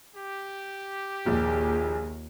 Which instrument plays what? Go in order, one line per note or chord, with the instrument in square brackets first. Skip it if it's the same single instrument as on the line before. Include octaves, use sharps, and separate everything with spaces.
[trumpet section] G4
[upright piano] A#1 [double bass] D#2 [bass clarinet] G#4